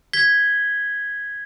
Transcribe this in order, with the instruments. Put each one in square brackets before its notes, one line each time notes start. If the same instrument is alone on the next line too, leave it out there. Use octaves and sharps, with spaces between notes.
[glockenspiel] G#6 B6 G7